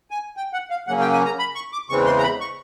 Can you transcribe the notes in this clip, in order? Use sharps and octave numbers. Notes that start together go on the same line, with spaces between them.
G#5
G5
F#5
F5
C#3 F#3 A#3 C#4 F#5
G5
G#5
A#5
B5
C#6
D6
E2 C#3 E3 G#3 C4 C#6
C6
A#5
B5
C#6